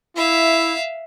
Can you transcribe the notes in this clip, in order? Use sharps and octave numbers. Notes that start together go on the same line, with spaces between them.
E4 E5 F5